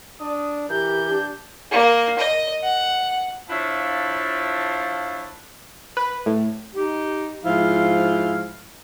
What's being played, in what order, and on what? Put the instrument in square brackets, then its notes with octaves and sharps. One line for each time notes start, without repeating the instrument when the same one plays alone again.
[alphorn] D4 [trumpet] D#6
[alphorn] E3 [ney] G4 [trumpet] A#4 [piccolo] G6
[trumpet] D4
[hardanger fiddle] A#3
D#5
F#5
[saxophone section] F3 D4 E4 F4 C#5 E5
[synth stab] B4
A2
[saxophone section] D#4 G4
G#2 F3 E4 F5